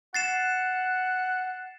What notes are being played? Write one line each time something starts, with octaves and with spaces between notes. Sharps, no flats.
F#5 A6 C7 E7